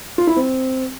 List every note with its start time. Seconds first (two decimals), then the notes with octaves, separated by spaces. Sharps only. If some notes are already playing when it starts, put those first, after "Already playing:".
0.18 F4
0.27 E4
0.36 C4